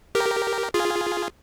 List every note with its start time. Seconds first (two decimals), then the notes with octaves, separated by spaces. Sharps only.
0.15 G4 A#4
0.74 F4 G#4